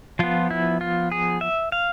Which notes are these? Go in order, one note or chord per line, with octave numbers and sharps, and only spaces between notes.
F3 B3 F4
E4
F4
G#4
E5
F5